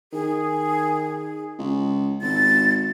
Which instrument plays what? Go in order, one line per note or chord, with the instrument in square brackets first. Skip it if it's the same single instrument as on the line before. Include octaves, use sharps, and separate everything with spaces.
[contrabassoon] D#3 [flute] G#4
[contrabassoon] C#2
[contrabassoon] G#1 [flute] A6